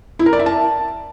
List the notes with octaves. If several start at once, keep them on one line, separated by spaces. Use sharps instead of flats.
E4
A#4
D5
E5
A5